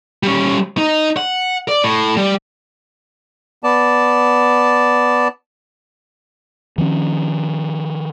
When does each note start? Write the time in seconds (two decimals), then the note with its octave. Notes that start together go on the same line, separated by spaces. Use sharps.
0.23 G3 C#4
0.78 D#4
1.17 F#5
1.68 D5
1.84 A2
2.17 G3
3.64 B3 D5 A5
6.78 D#3 F3 A3 C#4